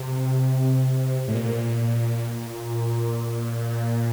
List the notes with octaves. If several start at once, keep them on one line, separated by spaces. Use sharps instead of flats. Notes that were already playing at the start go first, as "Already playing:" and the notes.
Already playing: C3
A2
A#2